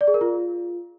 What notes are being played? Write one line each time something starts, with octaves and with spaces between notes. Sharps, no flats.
D5
G#4
A#4
F4